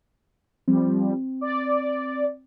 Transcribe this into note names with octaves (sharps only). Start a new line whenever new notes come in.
F3 G3 C4
D5